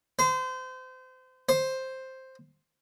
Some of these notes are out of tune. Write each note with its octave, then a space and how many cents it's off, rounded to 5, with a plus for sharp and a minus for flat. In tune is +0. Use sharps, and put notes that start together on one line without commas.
C5 -30
C5 +5